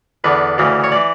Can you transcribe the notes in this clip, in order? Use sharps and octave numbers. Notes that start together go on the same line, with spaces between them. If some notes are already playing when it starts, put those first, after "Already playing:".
E2 D3 B4
D2 C#3 E3
C#5
E3 D5